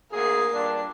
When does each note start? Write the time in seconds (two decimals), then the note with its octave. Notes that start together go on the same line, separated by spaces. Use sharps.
0.12 D2 A#3 G#4 C7
0.54 G2 A#2 D4